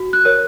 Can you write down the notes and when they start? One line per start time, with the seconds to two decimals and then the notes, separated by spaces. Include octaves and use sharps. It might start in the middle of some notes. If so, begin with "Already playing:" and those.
Already playing: F#4
0.13 F#6
0.25 A#4 C#5